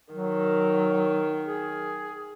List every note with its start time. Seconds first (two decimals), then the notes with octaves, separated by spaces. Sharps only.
0.13 D#3 F#3
1.43 G#4